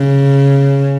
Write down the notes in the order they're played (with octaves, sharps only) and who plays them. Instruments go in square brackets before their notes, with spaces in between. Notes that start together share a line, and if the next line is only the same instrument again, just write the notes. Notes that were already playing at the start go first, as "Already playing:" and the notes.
Already playing: [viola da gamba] C#3